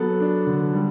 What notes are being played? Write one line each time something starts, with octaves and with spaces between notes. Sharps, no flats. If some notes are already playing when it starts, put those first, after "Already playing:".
Already playing: F#3 B3 A4
D4
D3
G3